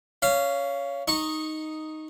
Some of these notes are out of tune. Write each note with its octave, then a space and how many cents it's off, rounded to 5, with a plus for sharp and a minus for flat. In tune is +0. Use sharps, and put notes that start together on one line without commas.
C#4 +15 F5 -20
D#4 +0 C#6 -15